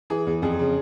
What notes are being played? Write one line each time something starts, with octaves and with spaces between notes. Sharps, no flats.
E3 G#4
E2
F2 G#4
C#3